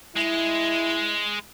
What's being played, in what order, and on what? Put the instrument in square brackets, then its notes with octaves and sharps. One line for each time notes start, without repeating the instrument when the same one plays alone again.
[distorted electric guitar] G#3 [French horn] E4